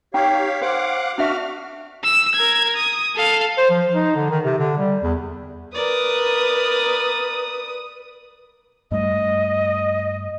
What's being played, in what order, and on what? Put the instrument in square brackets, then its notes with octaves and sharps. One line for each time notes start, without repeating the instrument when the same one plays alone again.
[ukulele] D#4 G5 [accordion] G4 C#5 F5
[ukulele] C5 [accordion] F5 F#5 D6
[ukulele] D4 E5 [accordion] F#4 F6
[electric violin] E6
A#4 G#6
D#6
A4 F5
[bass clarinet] C5
F3
D#4
D3
D#3
C3
D3
G3
E2
[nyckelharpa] A#4 D5 [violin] B4 D#6
[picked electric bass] G2 G3 A3 [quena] D#5